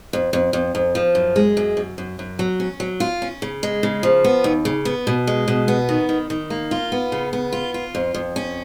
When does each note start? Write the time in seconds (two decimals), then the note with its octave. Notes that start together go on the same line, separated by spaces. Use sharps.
0.13 F2
0.33 F2
0.53 F2
0.75 F2
0.95 F3
1.15 F#2
1.36 G#3
1.57 F#2
1.77 F#2
1.98 F#2
2.19 F#2
2.39 F#3
2.60 C#4
2.80 F#3
3.00 F4
3.22 C#4
3.42 C#3
3.63 G#3
3.83 C#3
4.03 F3
4.24 B3
4.44 D#2
4.65 C#3
4.85 B3
5.07 B2
5.27 G#3
5.48 B2
5.68 B3
5.89 D#3
6.09 D#3
6.30 D#3
6.50 A#3
6.71 F4
6.92 B3
7.12 C#3
7.33 B3
7.52 F4
7.74 F4
7.95 F2
8.14 F2
8.36 C#4